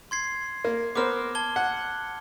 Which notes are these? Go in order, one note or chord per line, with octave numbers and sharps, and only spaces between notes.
C6 G#6 C7
A#3
B3 A#4 C5 D6 F6
A5 G#6 G7
F#5